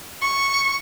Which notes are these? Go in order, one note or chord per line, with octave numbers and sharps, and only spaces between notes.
C#6